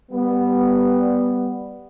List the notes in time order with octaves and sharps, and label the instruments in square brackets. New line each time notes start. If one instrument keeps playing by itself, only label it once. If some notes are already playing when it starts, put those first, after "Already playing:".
[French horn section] G3 B3